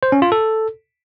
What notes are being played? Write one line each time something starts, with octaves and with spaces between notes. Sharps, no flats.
C5
C#4
F4
A4